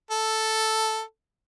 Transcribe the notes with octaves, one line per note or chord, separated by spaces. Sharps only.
A4